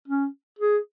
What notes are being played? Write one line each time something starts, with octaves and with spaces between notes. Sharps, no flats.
C#4
G#4